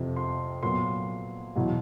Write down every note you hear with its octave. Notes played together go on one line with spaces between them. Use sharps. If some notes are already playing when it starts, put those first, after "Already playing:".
Already playing: F2 C3 F3
C6
A#2 F#3 B3 C6
E2 B2 F#3